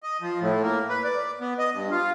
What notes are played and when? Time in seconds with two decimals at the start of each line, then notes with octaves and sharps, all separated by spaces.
0.03 D#5
0.21 F3
0.41 A2
0.63 A#3
0.89 B4
1.04 D5
1.40 B3
1.59 D#5
1.74 G2
1.91 F4